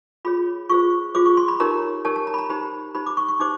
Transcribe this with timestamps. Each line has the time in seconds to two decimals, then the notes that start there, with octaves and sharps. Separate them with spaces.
0.25 F4 G#4 C#5 B5
0.70 F4 G#4 C5 C#6
1.15 F4 G#4 C5 D6
1.26 C#6
1.37 C6
1.48 B5
1.60 D#4 G4 A#4 C#5 A#5
2.05 D#4 G4 A#4 C#5 A5
2.16 A5
2.27 A#5
2.34 B5
2.38 A#5
2.50 D#4 G4 C5 B5
2.95 D#4 G4 C5 B5
3.06 D6
3.17 C#6
3.28 C#6
3.40 D#4 G4 C5 D6